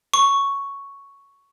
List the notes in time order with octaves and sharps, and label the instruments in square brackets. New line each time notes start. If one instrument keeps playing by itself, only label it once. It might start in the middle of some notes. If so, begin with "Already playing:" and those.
[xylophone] C#6